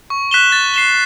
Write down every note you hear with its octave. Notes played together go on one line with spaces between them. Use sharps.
C#6
F#6 B6 E7 G7
A6
C7 E7 G7